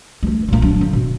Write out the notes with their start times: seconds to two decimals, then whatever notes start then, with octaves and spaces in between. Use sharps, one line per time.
0.23 G#3 A3
0.48 A#2 A#3
0.62 F#3 D4
0.81 D3
0.93 B2